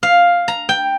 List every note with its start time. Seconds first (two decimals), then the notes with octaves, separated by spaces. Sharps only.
0.03 F5
0.48 A#5
0.69 G5